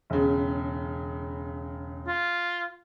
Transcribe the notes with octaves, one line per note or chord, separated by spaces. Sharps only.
E1 C#3
F4